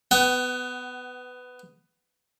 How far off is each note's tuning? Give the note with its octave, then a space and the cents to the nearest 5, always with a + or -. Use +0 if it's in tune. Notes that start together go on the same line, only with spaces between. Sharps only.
B3 +15 F#5 +40